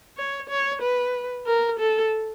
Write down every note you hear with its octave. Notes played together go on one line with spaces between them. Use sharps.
C#5
C#5
B4
A#4
A4